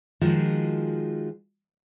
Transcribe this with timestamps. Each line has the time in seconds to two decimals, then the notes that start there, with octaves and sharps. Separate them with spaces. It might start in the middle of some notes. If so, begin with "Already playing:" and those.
0.21 D#3 F3 G#3 F4 F#4 G#4